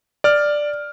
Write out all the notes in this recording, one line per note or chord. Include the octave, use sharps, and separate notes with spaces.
D5 F6